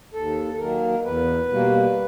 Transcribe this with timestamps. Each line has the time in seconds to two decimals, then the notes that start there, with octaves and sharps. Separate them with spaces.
0.14 D#2 A4
0.52 A4
0.59 D#3 F#3 A#3 A#4
1.04 E2 B4
1.49 B2 G3 A#3